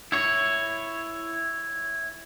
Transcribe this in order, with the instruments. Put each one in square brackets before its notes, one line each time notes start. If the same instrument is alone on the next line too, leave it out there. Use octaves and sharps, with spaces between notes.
[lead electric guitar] E4 C#5